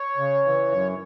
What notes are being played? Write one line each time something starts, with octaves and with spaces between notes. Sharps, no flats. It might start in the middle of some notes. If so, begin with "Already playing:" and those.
Already playing: C#5
C#3
E3
F#2